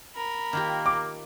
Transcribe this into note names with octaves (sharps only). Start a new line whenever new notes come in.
A#4 B5
D#3 A#3 F4 G4
D6